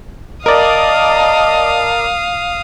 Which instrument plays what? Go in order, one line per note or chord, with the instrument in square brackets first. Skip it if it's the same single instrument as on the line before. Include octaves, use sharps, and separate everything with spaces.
[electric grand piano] A#4 D5 [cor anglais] D#5 [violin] F5 D#6 [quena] A5